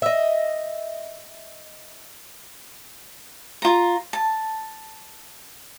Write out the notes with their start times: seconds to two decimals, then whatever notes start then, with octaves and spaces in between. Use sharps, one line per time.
0.02 D#5 E5
3.62 F4 A#5
4.13 A5